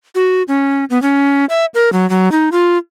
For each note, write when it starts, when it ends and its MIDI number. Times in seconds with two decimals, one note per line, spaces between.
0.15 0.43 66
0.48 0.85 61
0.90 1.01 59
1.02 1.45 61
1.49 1.65 76
1.74 1.92 70
1.93 2.08 54
2.10 2.31 54
2.32 2.49 63
2.52 2.78 65